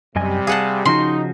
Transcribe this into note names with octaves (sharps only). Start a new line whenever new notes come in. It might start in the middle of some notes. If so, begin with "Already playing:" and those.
F#2 C3 G3 D#5 G#5
G#4 F5 F#5 A5
C#3 F3 D#4 F#4 C6